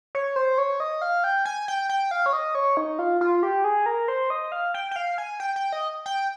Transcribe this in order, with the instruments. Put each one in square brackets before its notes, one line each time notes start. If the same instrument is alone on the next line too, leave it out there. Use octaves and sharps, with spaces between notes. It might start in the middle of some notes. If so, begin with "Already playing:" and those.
[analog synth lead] C#5
C5
C#5
D#5
F5
G5
G#5
G5
G5
F5
C#5
D#5
C#5
D#4
F4
F4
G4
G#4
A#4
C5
D#5
F5
G5
G5
F5
G#5
G5
G5
D#5
G5